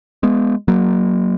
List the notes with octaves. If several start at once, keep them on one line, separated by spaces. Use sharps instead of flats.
G#3 B3
F#3 A#3